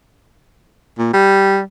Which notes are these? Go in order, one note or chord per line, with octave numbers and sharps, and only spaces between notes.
A#2
G3